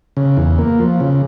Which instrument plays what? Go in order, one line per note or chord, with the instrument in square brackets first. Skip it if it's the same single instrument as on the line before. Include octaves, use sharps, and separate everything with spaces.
[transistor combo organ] C#3
E2
A#3
F3
C#3